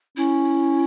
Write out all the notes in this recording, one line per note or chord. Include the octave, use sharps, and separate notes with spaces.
C#4 E4